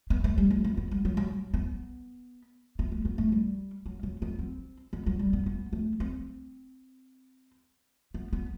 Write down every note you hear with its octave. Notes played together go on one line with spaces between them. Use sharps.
B3
A3
G3
A3
B3
B3
G3
F#3
F#3
B3
B3
A3
B3
A3
G3
F#3
F#3
B3
C4
B3
F#3
G3
B3
B3
A3
C4
B3
B3